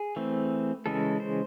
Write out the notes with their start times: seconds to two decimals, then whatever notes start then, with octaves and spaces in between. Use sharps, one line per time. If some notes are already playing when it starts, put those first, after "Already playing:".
Already playing: G#4
0.16 E3 A3 C4
0.86 C#3 E3 G#3 C#4 A4
1.20 C5